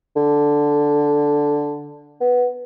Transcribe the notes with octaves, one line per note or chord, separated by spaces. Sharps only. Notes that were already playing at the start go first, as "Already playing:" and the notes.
D3
B3